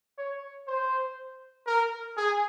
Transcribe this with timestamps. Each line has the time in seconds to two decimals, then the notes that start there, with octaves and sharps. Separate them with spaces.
0.18 C#5
0.67 C5
1.67 A#4
2.17 G#4